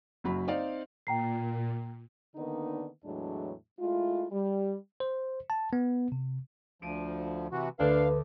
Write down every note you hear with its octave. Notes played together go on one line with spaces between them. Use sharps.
F#1 F#2 F#3 F#4 B5
C4 D#4 D5 F5
A#2 G5 A#5 C7
D3 D#3 A#3 B3 D4 D#4
E2 A2 F#3 G#3 D4
G#3 A3 E4 F4
G3
C5
A5
B3
C3
D2 F3 D7 D#7
C3 E3 F#4
D2 D4 B4 F5